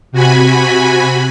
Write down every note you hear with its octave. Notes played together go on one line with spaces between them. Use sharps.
C3 F#4 G#5 B5